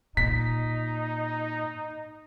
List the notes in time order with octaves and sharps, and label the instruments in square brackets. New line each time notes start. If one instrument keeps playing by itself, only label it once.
[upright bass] A#2 [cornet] D#4 [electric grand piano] B6